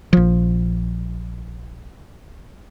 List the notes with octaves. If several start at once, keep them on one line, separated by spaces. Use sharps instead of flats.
A#1 F3